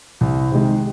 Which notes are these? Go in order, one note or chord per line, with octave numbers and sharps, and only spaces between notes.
C2
C3 D#3 G#3